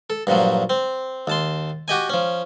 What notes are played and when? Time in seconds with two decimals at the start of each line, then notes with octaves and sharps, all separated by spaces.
0.10 A4
0.27 G2 A#2 F3 F#3
0.70 C4
1.27 D#2 A5 C6
1.88 F#4 G4 D#5 G#5
2.09 F3 C#4